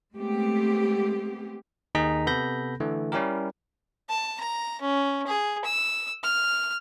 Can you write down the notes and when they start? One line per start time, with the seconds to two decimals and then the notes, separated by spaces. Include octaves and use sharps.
0.14 G#3 A3 B3 C4 G4
1.95 D#2 D#3 D#4 G#4 A#5 B6
2.27 C3 B3 A4 B5 G6 A#6
2.80 D3 E3 A3
3.12 G3 C#4 E4 G4 A#4
4.09 A5
4.40 A#5
4.81 C#4
5.27 G#4
5.65 E6
6.24 F6